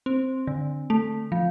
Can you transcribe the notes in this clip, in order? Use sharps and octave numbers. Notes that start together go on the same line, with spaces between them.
C4
D3
A3
F3